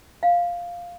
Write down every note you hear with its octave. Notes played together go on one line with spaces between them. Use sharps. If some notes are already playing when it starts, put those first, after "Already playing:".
F5